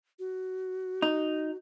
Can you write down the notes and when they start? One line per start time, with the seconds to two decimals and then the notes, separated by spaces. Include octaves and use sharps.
0.19 F#4
1.02 D#4